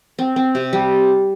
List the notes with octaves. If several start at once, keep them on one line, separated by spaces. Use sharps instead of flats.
C4
C4
C3
G3